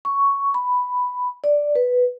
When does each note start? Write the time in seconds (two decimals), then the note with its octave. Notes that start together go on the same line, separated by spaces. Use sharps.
0.05 C#6
0.54 B5
1.44 D5
1.75 B4